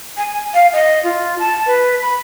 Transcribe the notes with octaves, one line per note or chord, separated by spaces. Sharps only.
G#5
F5
D#5
F4
A5
B4
B5